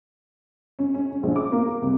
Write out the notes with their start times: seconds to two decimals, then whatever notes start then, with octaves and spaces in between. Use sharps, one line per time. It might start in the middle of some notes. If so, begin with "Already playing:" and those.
0.79 C#4
0.94 C#4
1.11 C#4
1.23 A#1
1.36 D6
1.52 A#3
1.66 A#4
1.82 C2